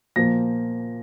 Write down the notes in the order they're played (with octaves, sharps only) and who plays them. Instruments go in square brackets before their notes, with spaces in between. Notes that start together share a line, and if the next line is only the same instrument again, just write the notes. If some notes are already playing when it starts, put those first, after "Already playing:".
[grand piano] A#2 F3 A#3 A#6